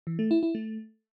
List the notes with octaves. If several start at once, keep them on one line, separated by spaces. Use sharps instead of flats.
E3
A3
E4
E4
A3